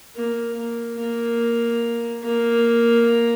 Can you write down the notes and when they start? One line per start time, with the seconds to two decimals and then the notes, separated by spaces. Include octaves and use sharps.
0.16 A#3
0.57 A#3
0.99 A#3
2.24 A#3